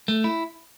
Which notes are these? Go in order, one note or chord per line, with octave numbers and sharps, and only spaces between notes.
A3
E4